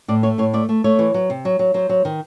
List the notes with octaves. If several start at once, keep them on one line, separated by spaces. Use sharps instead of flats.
A2 D5
A3 C#5
A2 C#5
A3 D5
A3
A3 C#5
E3
F#3
C3
F#3
F#3
F#3 C5
F#3
D#3